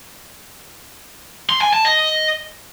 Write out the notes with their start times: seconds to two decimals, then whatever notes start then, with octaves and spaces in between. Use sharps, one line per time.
1.49 C6
1.61 G#5
1.73 A5
1.85 D#5